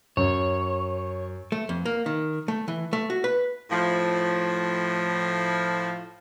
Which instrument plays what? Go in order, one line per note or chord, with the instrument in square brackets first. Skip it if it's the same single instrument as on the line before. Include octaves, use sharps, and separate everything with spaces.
[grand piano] F#2 [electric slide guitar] C#5
[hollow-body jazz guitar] A3
F2
A#3
D#3
A3
E3
A3
F#4
B4
[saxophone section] A2 F3